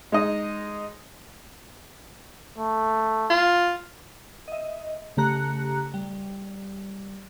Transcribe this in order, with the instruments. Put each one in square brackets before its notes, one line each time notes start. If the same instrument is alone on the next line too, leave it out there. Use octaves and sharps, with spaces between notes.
[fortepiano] G#3 D#4 D#5
[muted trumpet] A3
[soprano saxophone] F4
[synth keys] D#5 E5
C#3 A3 G4 A#5 F#6 C#7
G3